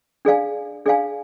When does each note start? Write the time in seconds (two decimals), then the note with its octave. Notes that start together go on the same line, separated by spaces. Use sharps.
0.25 D4 G#4 D5 F5 G#5
0.86 D4 G#4 D5 F5 G#5